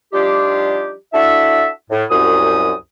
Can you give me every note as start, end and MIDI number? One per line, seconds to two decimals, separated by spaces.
0.13 0.92 53
0.13 0.92 55
0.13 0.92 62
0.13 0.92 63
0.13 0.92 65
0.13 0.92 67
1.13 1.67 62
1.13 1.67 64
1.13 1.67 66
1.13 1.67 69
1.13 1.67 76
1.90 2.04 45
2.10 2.71 36
2.10 2.71 42
2.10 2.71 87